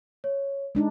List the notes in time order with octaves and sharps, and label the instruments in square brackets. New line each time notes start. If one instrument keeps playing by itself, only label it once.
[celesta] C#5
[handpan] G#3 D4 D#4